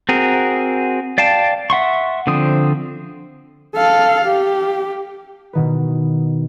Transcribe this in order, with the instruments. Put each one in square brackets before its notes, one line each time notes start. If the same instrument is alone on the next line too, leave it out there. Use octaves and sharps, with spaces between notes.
[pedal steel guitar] C4 F#4 G#4 A#4
D5 F5 G5 A5
E5 F#5 C6 C#6
D3 F3 C4 D#6
[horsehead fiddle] A4 F5
G4
[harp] B2 D#3 B4